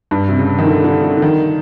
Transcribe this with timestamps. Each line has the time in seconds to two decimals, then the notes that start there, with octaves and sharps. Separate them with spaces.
0.11 G2
0.29 C3
0.39 C#3
0.58 D#3
0.67 D3
0.84 D3
1.04 D3
1.17 D3
1.22 D#3